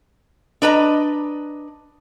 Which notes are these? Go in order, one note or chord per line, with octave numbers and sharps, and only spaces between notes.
D4 B4 D#5 A#5